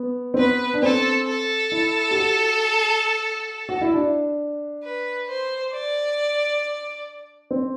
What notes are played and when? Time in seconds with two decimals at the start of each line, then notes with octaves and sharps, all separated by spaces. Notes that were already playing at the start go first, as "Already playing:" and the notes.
Already playing: B3
0.34 C4
0.38 B3 B4
0.74 D4
0.82 C4 A4
1.27 A4
1.72 E4
2.11 G4
2.16 F#4
3.69 F#4
3.81 E4
3.94 D4
4.84 B4
5.29 C5
5.73 D5
7.51 C4